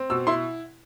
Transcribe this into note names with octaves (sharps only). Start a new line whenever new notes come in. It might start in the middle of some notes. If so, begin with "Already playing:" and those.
Already playing: C4
B2 E6
E4 C6